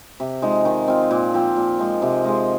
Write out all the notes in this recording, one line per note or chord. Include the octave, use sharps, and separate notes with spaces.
C3
F3 G#3 D#4
D#3
C4 F4
A#2
F3 C4 F4
A#2
F3 G#3
C3
G#3 F4 G#4